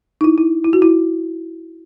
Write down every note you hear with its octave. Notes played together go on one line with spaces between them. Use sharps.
D#4
E4
E4
E4
F#4
E4